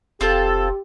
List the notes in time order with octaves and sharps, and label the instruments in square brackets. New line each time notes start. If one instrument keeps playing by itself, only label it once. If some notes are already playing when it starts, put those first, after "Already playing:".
[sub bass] F1 [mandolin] C4 F4 A4 [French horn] G4